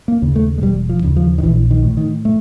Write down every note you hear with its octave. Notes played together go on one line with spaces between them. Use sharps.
A#3
D#2 C#3
A3
G#3
E1 G3
F3
D#2 C#3
F3
D#3
A#1 E3
D#3
A2
D#3
A3